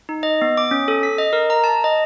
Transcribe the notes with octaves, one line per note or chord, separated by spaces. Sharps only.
D#4
D#5
B3
D6
C#4
A4
B6
D#5
A#4
A#5
A5
D#5